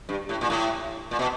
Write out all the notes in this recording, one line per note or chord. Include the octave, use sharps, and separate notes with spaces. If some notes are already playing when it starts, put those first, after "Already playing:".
G2
A2
A#2
A2
A#2
B2